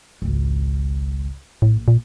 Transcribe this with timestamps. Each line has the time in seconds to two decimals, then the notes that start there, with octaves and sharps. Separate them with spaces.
0.22 G#1 C#2
1.62 A#1 A2
1.88 A#2